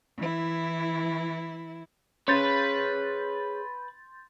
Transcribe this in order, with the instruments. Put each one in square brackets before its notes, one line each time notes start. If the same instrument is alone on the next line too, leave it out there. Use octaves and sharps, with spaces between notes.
[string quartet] E3 E4
[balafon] C#4 [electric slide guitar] G#4 C#5 [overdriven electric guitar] B4 [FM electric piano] C6 G6 A6